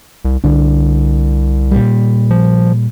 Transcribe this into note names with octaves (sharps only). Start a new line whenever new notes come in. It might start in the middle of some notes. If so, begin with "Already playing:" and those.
C2
C2 D3 D4
A#2 G3
F3